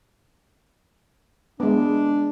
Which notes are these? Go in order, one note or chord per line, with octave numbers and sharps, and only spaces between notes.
G#3 B3 D4